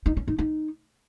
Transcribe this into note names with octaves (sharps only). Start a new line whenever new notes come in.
D#4
C#4
D#4
D#4